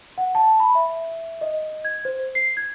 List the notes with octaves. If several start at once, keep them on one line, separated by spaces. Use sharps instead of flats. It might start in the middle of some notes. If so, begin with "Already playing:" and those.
F#5
A5
B5
E5
D#5
G#6
C5
C7
G#6